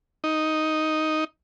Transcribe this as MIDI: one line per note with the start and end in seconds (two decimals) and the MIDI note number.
0.24 1.24 63